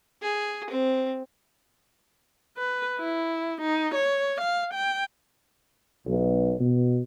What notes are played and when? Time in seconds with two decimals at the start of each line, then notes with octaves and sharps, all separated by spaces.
0.22 G#4
0.70 C4
2.57 B4
3.00 E4
3.61 D#4
3.95 C#5
4.41 F5
4.74 G5
6.07 B1
6.60 B2